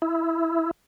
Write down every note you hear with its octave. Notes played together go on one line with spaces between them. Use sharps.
E4